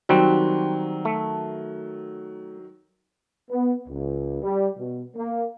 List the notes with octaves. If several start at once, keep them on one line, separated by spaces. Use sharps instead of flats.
D#3 F#3 G3 C4 F#4
A3
B3
C#2
G3
B2
A#3